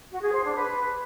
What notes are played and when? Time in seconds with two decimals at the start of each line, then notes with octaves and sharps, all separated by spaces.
0.11 F#4
0.22 G#4
0.33 C5
0.44 D4
0.56 B4